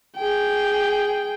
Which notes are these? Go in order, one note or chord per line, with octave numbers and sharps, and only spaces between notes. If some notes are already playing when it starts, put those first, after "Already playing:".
G#4 G5